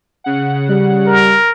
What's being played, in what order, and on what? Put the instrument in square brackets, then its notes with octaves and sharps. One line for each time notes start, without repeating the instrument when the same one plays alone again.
[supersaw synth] C#3 F#5
[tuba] G3
[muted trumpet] A#4